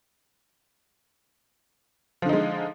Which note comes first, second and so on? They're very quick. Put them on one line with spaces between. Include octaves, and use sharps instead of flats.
F3 D3 D#4 G#3